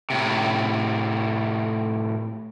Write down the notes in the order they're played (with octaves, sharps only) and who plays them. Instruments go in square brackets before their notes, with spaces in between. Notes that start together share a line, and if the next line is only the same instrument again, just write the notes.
[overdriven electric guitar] A2 C3